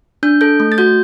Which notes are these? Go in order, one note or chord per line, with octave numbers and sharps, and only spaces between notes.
D4 G6
A4 G6
A3
A6
F#4 G6